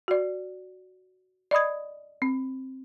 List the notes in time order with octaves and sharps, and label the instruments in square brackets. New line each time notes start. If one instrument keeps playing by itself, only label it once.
[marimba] F#4 D5
D5 D#5 B5 D#6 G#6
C4